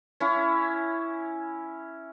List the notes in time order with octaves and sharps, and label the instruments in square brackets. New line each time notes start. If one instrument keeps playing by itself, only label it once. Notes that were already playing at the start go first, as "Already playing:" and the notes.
[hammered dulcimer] C#4 E4